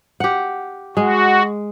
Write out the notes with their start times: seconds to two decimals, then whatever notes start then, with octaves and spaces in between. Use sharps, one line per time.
0.20 G4 F#5
0.97 G#3 F#4